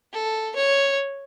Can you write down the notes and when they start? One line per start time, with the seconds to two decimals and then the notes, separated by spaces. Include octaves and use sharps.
0.13 A4
0.56 C#5